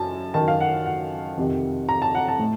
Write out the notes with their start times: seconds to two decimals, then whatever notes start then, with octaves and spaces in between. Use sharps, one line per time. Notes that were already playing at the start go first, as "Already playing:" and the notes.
Already playing: F#2 A5
0.34 F#2 D#3 A5
0.48 F5
0.60 F#5
0.86 F#5
1.37 F2 C3 D#3
1.89 A#5
2.02 A5
2.15 F#5
2.28 A5
2.40 A2